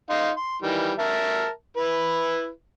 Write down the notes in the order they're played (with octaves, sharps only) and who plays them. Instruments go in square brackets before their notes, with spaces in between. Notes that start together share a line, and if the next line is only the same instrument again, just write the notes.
[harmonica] D#4 F5 C6
C6
D#3 E3 G3
A#4 E5 A5
E4 B4